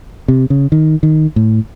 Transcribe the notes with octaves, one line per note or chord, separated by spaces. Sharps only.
C3
C#3
D#3
D#3
A2